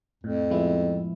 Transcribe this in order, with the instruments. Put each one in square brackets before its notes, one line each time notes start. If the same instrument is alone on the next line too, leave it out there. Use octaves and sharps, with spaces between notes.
[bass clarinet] F2 [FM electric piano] A2
[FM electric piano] F3 G#3 B3 E4